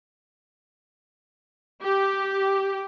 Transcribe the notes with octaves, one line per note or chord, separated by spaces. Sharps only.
G4